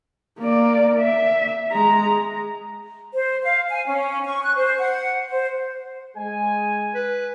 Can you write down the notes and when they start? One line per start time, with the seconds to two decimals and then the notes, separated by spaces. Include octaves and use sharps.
0.39 A#3 D5
1.00 E5
1.72 G#3 A#5
3.13 C5
3.42 F5
3.69 G#5
3.85 C#4
4.24 C#6
4.42 F#6
4.55 C5
4.79 F#5
5.30 C5
6.17 G#3 G#5
6.95 B4